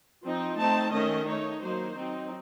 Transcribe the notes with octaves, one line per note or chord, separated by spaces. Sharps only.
F3 C4 D#4
A3 C4 D#4 A5
D#3 A3 C#4 D#5
A3 D#4 C#5
F#3 A#3 D#4 C5
F#3 C4 D#4